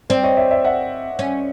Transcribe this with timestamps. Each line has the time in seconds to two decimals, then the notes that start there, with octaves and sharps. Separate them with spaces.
0.10 C4 C5 D5
0.23 C#5 D#5
0.37 D5 E5
0.51 D5 E5
0.64 E5 F#5
1.19 C#4